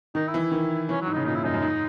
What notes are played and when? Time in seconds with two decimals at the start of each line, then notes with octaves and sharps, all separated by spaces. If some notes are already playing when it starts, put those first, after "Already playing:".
0.15 D#3 D#4
0.27 E4
0.34 E3
0.40 E4
0.52 D#3
0.89 E3 C#4
1.01 F#3
1.07 G#2
1.13 C#3 D#4
1.25 A#2 D#4
1.35 G#2 E4
1.44 F#2 D#4
1.54 F#2
1.62 G#2